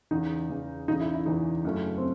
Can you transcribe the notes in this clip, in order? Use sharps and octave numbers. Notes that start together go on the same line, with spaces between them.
E2 C#3 E3 D#4
E2 C#3 E3
E2 C#3 E3 D#4
E4
E4
E2 C#3 E3 D#4
F#2 C#3 E3 A3 C#4
C4